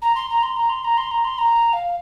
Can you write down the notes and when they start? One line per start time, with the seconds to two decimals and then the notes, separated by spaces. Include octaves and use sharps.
0.02 A#5
0.15 C6
0.30 A#5
0.43 C6
0.57 A#5
0.70 C6
0.84 A#5
0.98 C6
1.11 A#5
1.25 C6
1.38 A#5
1.73 F5